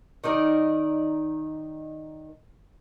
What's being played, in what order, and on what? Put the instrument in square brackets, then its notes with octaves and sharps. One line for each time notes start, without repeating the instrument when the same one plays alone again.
[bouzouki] D#3 D#4 A#4 D5